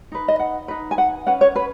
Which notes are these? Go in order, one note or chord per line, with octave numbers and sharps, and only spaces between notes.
D#4 B4
D#5
F#5
D#4 B4
G#5
F#5
C#4 B4 F#5
C#5
B4